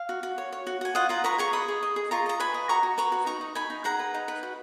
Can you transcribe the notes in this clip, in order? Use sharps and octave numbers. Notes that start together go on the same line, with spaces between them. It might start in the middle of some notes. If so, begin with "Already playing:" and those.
Already playing: F5
F#4
F#4
C#5
C#5
F#4
F#4 G#5
F4 D#5 F#5
F4 F#5 A#5
B4 A#5 C#6
G#4 A#5 C#6
D#5 B5 D#6
G#4
D#5
G#4
F4 A#5 C#6
D#5 A#5
B4 G#5 B5
D#5
F#4 A#5 C#6
F#4
B4 A#5 C#6
F#4
D#4 A#5 C#6
D#4
D#4 G#5 B5
D#4
G#4 F#5 A#5
B4
D#4
B4
F#4